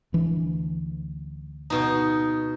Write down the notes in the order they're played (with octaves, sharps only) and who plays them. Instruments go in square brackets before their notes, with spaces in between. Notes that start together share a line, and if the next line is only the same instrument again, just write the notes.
[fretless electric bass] D2 E3 D4
[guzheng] B2 D#4